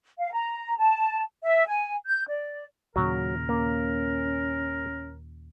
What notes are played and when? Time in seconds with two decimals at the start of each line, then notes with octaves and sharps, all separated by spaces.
0.19 F5
0.32 A#5
0.78 A5
1.43 E5
1.67 G#5
2.06 G6
2.28 D5
2.96 D#2 A#2 C#3 F#3 A#4
3.49 A#3 C#4